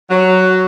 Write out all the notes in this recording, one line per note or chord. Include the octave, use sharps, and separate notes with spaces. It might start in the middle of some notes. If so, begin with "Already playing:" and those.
F#3